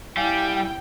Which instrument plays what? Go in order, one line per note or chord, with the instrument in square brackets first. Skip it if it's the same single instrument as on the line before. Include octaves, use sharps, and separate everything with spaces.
[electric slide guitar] G3 [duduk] E4 [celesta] F5 G#5 [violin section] G5